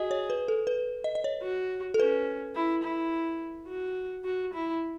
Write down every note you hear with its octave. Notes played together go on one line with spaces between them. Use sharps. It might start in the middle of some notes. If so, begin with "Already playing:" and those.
Already playing: F#4 G#4 D#5
C#5
B4
A4
B4
D#5
D#5
C#5
F#4
A4
C#4 B4
E4
E4
F#4
F#4
E4